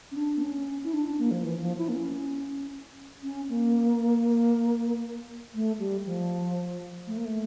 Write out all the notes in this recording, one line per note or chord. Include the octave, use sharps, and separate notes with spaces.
C#4
D4
A#3
C#4
E4
D4
D4
A#3
F3
E3
F3
E4
A#3
C#4
C#4
A#3
A3
G3
F3
A3
A#3
A3